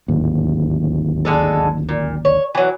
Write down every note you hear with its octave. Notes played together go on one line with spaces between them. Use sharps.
D1 G#1 D#2
D3 G#3 A4
A#2
C#5
E3 F#3